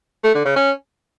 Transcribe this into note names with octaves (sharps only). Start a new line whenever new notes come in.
A3
D3
C#3
C#4